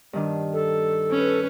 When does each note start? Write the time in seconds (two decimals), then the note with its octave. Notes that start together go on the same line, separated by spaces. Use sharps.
0.13 G2 D#3 D4
0.53 A4
1.11 C#4 B4